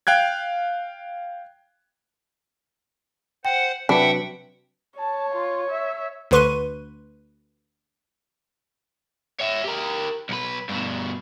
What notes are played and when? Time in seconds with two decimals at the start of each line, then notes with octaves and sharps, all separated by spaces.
0.07 F5 G5 F#6 G#6
3.45 C5 F#5 G5
3.89 C3 F#3 D4 B4 E5 F#5 G5 B5
4.99 C#5 A5
5.33 F4
5.71 E5
6.31 D2 D3 B4 C6 C#6 D#7
9.40 C#5 E5
9.64 G4 A#4
10.29 B1 B4
10.69 G2 B2